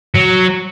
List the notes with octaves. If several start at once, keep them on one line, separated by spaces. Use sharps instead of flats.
F#3